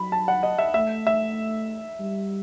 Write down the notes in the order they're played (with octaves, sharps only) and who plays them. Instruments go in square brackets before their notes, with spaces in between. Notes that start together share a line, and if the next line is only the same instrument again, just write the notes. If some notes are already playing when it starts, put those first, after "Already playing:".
Already playing: [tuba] F#3 [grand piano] B5
[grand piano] A5
F#5
D#5
E5
[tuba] A3 [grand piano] E5
[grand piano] E5
[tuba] G3